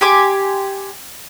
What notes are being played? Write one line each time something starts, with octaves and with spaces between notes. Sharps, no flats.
G4 G#5 C6 D6